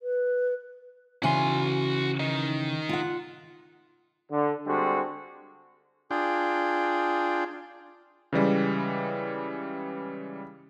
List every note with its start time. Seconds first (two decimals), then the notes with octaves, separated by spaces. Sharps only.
0.02 B4
1.23 C#3 E3 F#4 G#5 C6
2.20 D#3 D#4
2.89 F4 F#5
4.31 D3
4.66 D3 G3 G#3 C4 F#4
6.11 D4 F4 G#4 G5
8.33 C#3 E3 G3 G#3